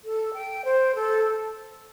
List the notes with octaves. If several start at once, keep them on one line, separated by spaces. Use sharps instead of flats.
A4
G5
C5
A4